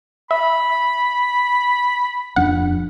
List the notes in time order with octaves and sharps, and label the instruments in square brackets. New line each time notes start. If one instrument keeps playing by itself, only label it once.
[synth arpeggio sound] E5 [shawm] B5
[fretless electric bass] D#1 F2 D4 [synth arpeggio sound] F#5